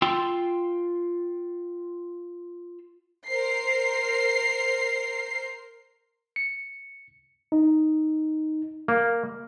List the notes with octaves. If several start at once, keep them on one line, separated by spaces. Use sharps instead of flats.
F4 G5 C6 E6
A#4 C5 C7
C#7
D#4
A#3